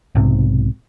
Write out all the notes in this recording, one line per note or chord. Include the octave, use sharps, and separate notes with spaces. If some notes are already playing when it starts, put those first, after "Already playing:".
B1 G#2 C3